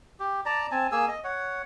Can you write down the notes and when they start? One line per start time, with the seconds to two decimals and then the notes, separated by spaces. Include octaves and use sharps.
0.20 G4
0.46 D5 A5 A#5
0.71 C4 G#5 A5
0.92 A#3 G#4 G#5 E6
1.08 D#5
1.24 C#5 F#5